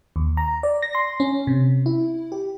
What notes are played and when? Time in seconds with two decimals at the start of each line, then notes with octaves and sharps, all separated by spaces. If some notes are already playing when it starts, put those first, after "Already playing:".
0.16 D#2
0.37 A#5
0.63 D5
0.82 A#6
0.95 C6
1.20 C#4
1.47 C3
1.86 E4
2.32 G4